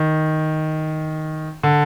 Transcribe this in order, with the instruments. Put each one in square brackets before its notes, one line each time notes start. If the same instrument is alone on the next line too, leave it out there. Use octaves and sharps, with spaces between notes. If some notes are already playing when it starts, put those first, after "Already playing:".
Already playing: [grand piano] D#3
D3